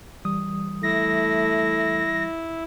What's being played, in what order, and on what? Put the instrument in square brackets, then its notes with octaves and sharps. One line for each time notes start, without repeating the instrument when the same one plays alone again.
[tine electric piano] E3 G3 D#6
[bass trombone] A3 [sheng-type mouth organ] E4 [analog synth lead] A#6